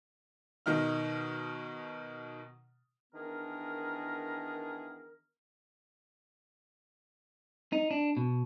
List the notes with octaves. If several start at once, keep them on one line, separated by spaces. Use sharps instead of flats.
B2 D#3 D#4 F6
D#3 E3 B3 D4 G#4 A#4
D#4
D4
B2